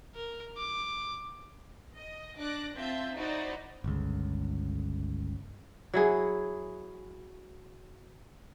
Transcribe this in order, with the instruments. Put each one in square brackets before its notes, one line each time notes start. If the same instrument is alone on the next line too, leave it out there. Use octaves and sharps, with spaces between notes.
[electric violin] A#4
D6
[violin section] D#5
D4 D6 F#6 A#6
C4 F4 E5 A5 G6
D#4 E4 F#4 C5 D5 D#5
[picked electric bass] G1 C#2
[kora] F#3 E4 G#4